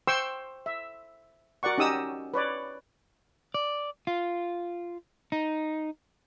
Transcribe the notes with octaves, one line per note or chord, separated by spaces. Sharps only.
C5 G5 C6 C#6 E6
E5
F#4 A#4 D5 F#5 C#6
C#4 D#4 G4 D#6 E6
B4 C#5 D5
D5
F4
D#4